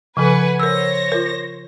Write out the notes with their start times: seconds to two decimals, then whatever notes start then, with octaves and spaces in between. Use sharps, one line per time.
0.17 C#3 F3 A4 B4 F#5 G#5
0.59 A#4 C5 C#5 E6 A#6
1.12 F4 A#4